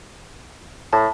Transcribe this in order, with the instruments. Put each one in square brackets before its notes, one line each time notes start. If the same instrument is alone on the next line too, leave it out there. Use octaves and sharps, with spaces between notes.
[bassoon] A2 [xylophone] A5